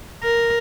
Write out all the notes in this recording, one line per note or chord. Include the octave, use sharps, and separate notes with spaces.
A#4